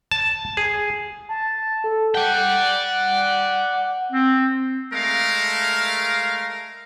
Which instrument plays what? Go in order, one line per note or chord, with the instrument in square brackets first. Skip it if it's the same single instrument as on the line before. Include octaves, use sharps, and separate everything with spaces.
[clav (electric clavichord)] A5
G#4
[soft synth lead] A5
A4
[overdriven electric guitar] D5 G5 [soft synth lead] F#5
[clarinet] C4
[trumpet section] G#3 A3 A#4 F5